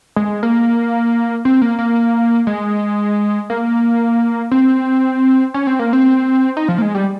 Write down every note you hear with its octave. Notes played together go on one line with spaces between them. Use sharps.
G#3
A#3
C4
A#3
A#3
G#3
A#3
C4
C#4
C4
A#3
C4
D#4
F3
A#3
G#3
G3